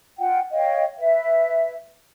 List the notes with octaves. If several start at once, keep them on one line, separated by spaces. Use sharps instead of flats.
F4 F#5 G5
C#5 D#5 F5 G5
B4 E5